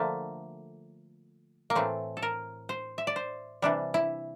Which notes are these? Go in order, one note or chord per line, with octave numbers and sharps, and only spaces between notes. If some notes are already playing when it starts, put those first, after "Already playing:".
Already playing: D3 F3 A3 A#3
A#3
A2 E3 A3 C4
A4
A#4
C5
E5
D5
C5
C3 E3 G3 D4
E4